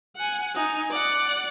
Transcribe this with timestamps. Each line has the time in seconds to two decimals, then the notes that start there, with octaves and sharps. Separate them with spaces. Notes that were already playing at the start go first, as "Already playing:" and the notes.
0.16 F#5 G#5
0.55 D#4 G#5
0.91 D5 F#5